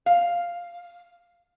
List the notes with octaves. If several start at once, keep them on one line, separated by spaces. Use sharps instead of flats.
F5